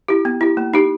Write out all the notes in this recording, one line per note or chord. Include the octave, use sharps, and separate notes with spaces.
E4 G4
B3
E4 G4
A#3
D#4 G4